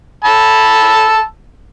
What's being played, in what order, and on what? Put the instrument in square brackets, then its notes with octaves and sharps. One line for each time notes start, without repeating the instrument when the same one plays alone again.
[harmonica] A5 B5 E6